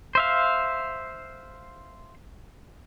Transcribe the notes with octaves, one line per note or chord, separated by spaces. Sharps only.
C5 E5 F5